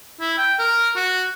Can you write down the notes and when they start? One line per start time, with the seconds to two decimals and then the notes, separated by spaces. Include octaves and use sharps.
0.20 E4
0.38 G5
0.59 A#4
0.96 F#4